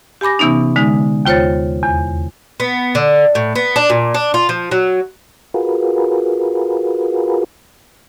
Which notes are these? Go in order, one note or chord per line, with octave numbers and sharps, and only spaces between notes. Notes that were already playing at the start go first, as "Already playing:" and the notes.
G4 G#5 B5 D6 A#6
C3 E3 B3 C#4 D#4
D3 G#3 D#4
D#2 F4 C5 C#5 A6
E2
B3
D3
A2
B3
D4
A#2
D4
F4
F3
F#3
F4 F#4 G#4 A#4 B4